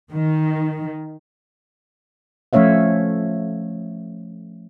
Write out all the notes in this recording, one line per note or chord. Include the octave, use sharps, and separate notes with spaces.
D#3
F3 A3 C#4 C#5 E5 F5